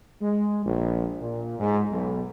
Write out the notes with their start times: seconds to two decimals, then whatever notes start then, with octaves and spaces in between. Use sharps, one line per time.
0.21 G#3
0.65 A#1
1.20 A#2
1.59 G#2
1.91 B1